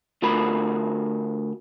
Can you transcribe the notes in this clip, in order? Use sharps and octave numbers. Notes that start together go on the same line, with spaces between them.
D3 A3 F4 F#4 A#4 B5